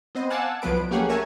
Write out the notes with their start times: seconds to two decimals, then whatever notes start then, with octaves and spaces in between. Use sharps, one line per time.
0.15 B3 C4 C5 D#5
0.30 F5 F#5 G#5 A5 D6 E6
0.62 C2 F3 F#3 B3 B4 D7
0.91 A3 A#3 C#4 G4 G#4 F#5
1.09 A#4 C#5 E5 G#5 A5